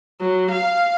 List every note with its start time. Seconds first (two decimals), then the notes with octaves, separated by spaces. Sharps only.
0.20 F#3
0.51 F5